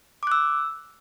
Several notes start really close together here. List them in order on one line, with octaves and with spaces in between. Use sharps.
D6 F#6 E6